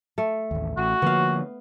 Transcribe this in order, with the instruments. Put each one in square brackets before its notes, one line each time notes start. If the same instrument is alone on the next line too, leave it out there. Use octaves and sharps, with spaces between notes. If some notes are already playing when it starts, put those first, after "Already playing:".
[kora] A3
[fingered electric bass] A1 D#2
[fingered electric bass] A1 [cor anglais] F#4
[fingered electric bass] D3 F3 A#3 [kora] B3 F5